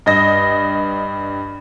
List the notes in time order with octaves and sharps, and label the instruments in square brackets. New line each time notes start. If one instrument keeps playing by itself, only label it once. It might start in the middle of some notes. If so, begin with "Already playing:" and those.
[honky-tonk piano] G2 D#5 A#6